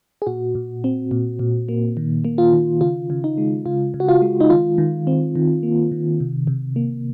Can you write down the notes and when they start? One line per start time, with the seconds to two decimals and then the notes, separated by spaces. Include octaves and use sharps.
0.22 G#4
0.27 A#2 F#4
0.55 A#2
0.84 C4
1.11 A#2
1.39 A#2
1.69 A#3
1.97 D#3
2.25 A#3
2.38 F4
2.53 D#3
2.81 C#3 F4
3.10 C#3
3.24 D#4
3.38 G#3
3.66 C#3 F4
3.94 C#3
4.00 F#4
4.08 F4
4.22 G#3
4.40 D#4
4.50 D#3 F4
4.78 D#3
5.07 C4
5.36 D#3
5.63 A#3
5.92 D#3
6.20 C3
6.47 C3
6.76 A#3